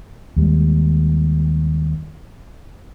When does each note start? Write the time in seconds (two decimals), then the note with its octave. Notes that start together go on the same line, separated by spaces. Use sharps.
0.36 D#2 G3 G#3